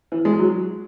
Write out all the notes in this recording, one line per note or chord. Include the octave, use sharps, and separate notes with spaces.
E3
G#3
F#3